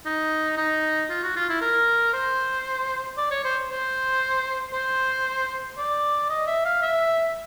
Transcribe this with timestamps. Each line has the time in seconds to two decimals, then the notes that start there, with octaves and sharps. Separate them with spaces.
0.06 D#4
0.58 D#4
1.10 F4
1.23 F#4
1.36 F4
1.49 E4
1.61 A#4
2.13 C5
3.17 D5
3.31 C#5
3.45 C5
3.70 C5
4.73 C5
5.78 D5
6.30 D#5
6.47 E5
6.65 F5
6.82 E5